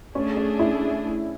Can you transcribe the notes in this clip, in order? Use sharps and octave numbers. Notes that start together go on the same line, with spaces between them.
A3 C#4 D4 G#4
C#4
E4